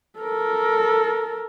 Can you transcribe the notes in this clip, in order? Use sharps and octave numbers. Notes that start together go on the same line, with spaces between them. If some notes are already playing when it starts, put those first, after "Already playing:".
A4 A#4